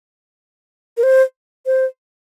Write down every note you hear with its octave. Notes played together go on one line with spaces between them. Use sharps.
A#4
C5
C5